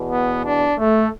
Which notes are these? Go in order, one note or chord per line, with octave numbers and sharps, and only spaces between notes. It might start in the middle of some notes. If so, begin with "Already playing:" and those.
Already playing: E2 B2
B3
D4
A3